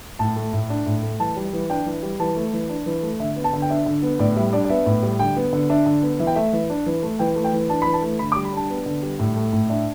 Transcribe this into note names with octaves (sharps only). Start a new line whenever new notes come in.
A2 A5
A3
A2
D4
A2
A3
E3 A5
G3
E3
D4 G5
E3
G3
E3 A5
A3
E3
D4
E3
A3
D3 E5
B3
A5
D3
G5
D4 E5
D3
B3
A2 D5
G3 E5
D4 D5
D5
B3 E5
A2
G3
D3 G5
B3
D3
D4 E5
D3
B3
E3 E5
G5
A3 E5
E3
D4
E3
A3
E3 G5
A3
G5
E3
D4 A5
E3 B5
A5
A3
D3 B5
D6
G3
B5
D4 A5
B3
D3
G3
A2
A3
A2
D4 E5